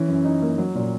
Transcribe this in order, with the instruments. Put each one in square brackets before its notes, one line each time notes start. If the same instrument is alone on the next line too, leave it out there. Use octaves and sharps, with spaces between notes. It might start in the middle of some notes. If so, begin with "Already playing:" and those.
Already playing: [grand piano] E3 C#4
F#2
D#4
A#3
F#3
A#2